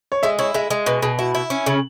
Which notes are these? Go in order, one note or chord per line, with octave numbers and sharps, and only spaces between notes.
C#5
G#3 E5
E4 C#5
G#3 E5
G#3
B2 B4
B2 G#4
E4 F#4
E4
C#4
C#3